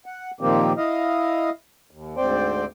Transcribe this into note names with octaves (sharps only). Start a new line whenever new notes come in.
F#5
A#2 D#3 F3 A#3 C4 G4
E4 D#5 F5
D#2
D2 G#2 C4 C5 D5 G5